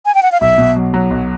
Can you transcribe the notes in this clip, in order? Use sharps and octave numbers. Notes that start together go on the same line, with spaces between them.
G#5
G5
F#5
F5
B1 E5
B2
F#3
F#3
B1